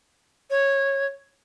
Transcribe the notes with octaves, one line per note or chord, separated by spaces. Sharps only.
C#5